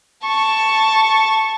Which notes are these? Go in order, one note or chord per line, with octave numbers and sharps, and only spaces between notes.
A5 C#6